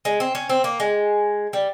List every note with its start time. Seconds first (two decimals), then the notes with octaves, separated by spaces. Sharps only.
0.05 G#3
0.20 C4
0.35 C#4
0.49 C4
0.64 A#3
0.80 G#3
1.53 G3